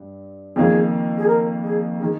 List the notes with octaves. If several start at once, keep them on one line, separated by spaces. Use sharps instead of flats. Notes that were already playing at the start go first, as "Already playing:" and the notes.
Already playing: G2
F2 D#3 A#3 G#4
G#4
A#4
G#4
D#3 G#4